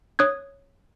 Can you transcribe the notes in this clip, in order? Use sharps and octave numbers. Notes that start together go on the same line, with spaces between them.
C#5 D#6 F#6 G#6